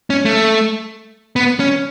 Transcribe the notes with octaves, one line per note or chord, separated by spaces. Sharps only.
C#4
A3
B3
C#4